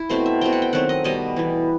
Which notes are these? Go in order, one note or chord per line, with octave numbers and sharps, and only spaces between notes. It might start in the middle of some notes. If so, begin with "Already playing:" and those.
Already playing: E4
B2 A3 C4 C5
E5
B2 A3 C4 G5
F#5
G5
D#3 F#3 A3 C4 F#5
D#5
B2 G3 B3 D#5
E3 B3